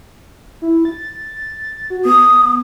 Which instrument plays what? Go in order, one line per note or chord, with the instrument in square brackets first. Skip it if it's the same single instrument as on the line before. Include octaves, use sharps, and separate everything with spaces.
[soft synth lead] E4
A6
F#4
[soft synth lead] B3 [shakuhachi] D#6